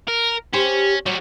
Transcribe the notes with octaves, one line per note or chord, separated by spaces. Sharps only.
A#4
C#4 G4 C5
F#3 G3 F#4